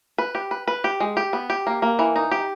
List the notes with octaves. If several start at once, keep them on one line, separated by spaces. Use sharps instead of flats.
B4
G4
B4
B4
G4
G#3
G4
B3
G4
A#3
A#3
E3
D#4
G4